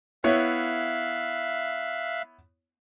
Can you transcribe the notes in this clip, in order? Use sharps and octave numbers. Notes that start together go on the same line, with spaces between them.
B3 E4 C#5 E5 F5 F#6